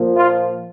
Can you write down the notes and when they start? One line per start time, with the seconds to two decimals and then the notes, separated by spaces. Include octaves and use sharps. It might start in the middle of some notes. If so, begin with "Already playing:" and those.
Already playing: A#2 F3 A#3
0.14 F4